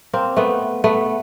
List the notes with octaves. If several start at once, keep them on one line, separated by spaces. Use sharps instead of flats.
A#3 C4
A3 B3
A3 B3